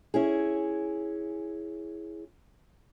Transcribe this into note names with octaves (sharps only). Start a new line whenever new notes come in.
C#4 E4 G#4